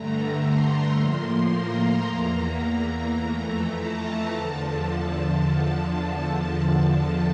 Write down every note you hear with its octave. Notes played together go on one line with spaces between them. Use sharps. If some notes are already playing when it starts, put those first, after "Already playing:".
Already playing: G2 D3 A3 A#5
C6
A2 F3 A#3 C6
A#5
E2 E3 A#3
A#5
F2 E3 A3
A5
E2 D3 F3